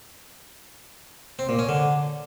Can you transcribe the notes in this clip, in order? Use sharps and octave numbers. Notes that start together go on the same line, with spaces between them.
C4
A#2
C#4
D3